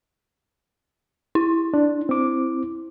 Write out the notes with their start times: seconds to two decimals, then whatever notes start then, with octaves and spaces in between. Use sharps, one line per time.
1.35 E4
1.74 D4
2.09 C4 D6